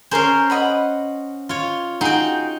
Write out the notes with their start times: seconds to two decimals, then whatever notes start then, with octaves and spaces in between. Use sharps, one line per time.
0.11 C#4 G#4 A#4 C5 A#5
0.50 D#5 F#5 B5
1.49 F4 C#5
2.01 D#4 F#4 G#4 G5